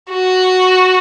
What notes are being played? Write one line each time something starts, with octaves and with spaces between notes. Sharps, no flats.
F#4